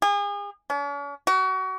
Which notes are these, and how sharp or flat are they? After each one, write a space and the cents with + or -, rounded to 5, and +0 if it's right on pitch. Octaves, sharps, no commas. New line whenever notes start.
G#4 -40
C#4 +45
F#4 +30